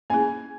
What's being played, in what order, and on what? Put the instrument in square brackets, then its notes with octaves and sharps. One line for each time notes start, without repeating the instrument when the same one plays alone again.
[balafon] A#3 C#4 E4 G#4 [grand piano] G#5